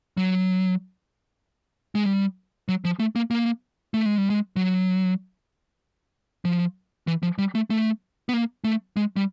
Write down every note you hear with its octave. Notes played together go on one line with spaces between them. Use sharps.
F#3
G#3
G3
F#3
F3
A3
A#3
A#3
A3
G#3
G3
G#3
F#3
F3
E3
F3
G3
A3
A3
B3
A#3
A3
G#3
G3